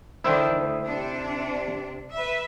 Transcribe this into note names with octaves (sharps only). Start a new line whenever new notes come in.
D3 D#3 D4 E4 C5 G5
D2
C3 D4
B4 E5